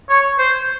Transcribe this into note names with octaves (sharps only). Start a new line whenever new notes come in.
C#5
C5